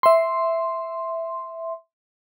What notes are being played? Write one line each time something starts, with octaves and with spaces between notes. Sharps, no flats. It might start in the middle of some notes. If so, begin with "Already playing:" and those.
E5 C6